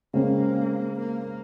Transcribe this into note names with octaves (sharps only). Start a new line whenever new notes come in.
C#3 G#3 A#3 C4
A#3